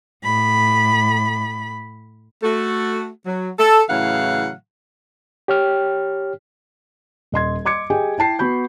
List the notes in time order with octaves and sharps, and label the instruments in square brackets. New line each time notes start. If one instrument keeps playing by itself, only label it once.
[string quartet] A2 B5
[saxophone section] A3 F#4 A4
F#3
A4
A2 C#3 E3 F#3 F5 F#5
[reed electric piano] G4 C#5 G5 F6
[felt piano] D#1 D#5 C6 G#6
D#5 C6 D6 G#6 C#7
G4 G#4 D#5 G5 G#5
E4 G5 A5 C7
B3 F#4 B5 G6